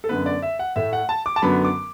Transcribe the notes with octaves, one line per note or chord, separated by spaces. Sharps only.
A4
F#2 D3 B3 B4
D5
E5
F#5
A2 A3 E5
F#5
A5
D6
A5
F#2 D3 F#3 B3 B5
D6